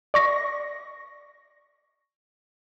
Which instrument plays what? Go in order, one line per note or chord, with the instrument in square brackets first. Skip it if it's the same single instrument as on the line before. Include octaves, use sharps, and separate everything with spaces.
[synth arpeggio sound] D5 C#6 A#6